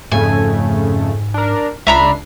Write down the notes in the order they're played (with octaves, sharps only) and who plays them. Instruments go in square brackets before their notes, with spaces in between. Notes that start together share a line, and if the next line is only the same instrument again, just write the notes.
[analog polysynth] F2 C#3 A3 [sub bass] G#2 [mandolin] G#5
[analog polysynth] D4 A#4
[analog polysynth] C#2 D4 C7 [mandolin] E5 A#5 B5